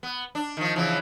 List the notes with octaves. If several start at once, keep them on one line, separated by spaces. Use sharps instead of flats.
B3
D4
D#3 F3
C#3 E3 F3